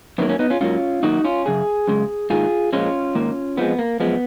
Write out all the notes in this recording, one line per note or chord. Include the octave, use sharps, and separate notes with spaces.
F#2 D#3 F#3 A#3 B3
A#3 C#4
B3 D#4
C#4 F4
G#2 F#3 A#3 C#4 F4
F#2 D#3 A#3 D#4 F#4
C#4 F4
F#2 C#3 G#4
F#2 C#3 G#3
G#2 D#3 A#3 F4 G#4
A#2 F3 G#3 C#4 F4
G#2 D#3 A#3
F2 F3 G#3 B3
A#3
F#2 F3 G#3 B3